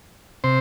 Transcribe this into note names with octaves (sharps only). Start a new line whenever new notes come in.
C3 C5